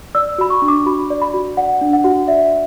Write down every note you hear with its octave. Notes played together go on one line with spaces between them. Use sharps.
D5 E6
F#4 B5
C#6
D4
D6
F#4 B5
D5
B5
F#4
D5 F#5
D4
F#5
F#4
D5 E5